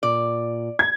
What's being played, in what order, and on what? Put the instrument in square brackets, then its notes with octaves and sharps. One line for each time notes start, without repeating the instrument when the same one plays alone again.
[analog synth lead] A#2 [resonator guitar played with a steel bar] D5
[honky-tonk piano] G#6